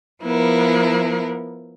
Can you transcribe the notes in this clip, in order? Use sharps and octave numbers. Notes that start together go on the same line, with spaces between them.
F3 B3 E4 A#4